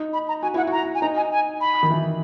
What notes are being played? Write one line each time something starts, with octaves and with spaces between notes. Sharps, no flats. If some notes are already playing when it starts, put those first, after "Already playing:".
Already playing: D#4
B5
A#5
F#4 G#5
E4 F#5
F#4 A#5
G#5
D#4 A#5
G#5
G#5
B5
D#3
E3